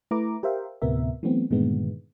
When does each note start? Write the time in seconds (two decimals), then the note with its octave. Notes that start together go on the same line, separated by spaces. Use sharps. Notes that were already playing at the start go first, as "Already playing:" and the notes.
0.11 A3 E4 B4 A#5 D6
0.43 G4 A#4 C5 E5 F5 G5
0.82 D2 A2 C3 B3 A#4 E5
1.23 E3 F#3 A3 B3 C4
1.51 G2 A#2 D3 D#3 G#3 B3